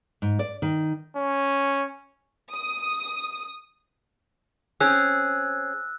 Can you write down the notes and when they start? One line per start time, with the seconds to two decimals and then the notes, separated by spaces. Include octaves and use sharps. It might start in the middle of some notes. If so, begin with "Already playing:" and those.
0.22 G#2
0.39 D5
0.62 D#3
1.17 C#4
2.50 D#6
4.81 C4 C#4 G#4 E6 F#6